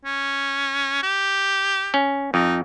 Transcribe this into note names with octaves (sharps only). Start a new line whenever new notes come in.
C#4
G4
C#4
F2 D#4